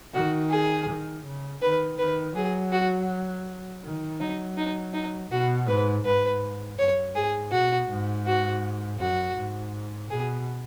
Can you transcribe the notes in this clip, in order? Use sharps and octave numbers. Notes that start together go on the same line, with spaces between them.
D#3 F#4
G#4
D#3
C#3
D#3 B4
D#3 B4
F#3 G#4
F#4
D#3
F#3 D#4
D#4
D#4
B2 F#4
G#2 B4
G#2 B4
F#2 C#5
G#2 G#4
B2 F#4
G#2
F#4
F#2 F#4
G#2
B2 G#4